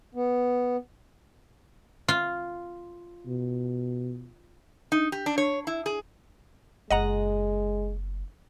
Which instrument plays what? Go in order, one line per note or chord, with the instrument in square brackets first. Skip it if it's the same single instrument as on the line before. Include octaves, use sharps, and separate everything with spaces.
[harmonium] B3
[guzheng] F4
[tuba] B2
[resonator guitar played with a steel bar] D#4
G4
D4
C#5
E4
G#4
[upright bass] F#1 F4 [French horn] G#3 [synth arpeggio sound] D#5 F#5 A#5